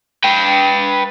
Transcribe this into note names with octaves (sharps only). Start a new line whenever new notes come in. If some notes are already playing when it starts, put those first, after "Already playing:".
B4 G5